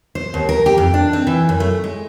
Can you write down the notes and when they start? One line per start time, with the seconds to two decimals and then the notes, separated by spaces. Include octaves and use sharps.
0.15 C5
0.34 D#2
0.49 A#4
0.66 G4
0.78 F2
0.94 D4
1.13 C4
1.27 E3
1.49 F#2
1.60 A3
1.84 G#3